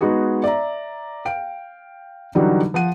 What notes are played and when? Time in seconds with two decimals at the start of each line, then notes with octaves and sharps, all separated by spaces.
0.01 G#3 B3 D#4 F#4 G#4
0.44 D5 E5 A#5
1.25 F5 G5 D7
2.35 D3 E3 F#3 G3 D#4 F#4
2.74 F3 F#5 D#7